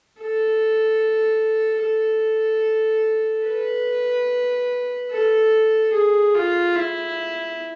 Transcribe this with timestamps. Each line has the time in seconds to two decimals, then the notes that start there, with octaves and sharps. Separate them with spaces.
0.20 A4
1.84 A4
3.48 B4
5.11 A4
5.93 G#4
6.35 F4
6.75 E4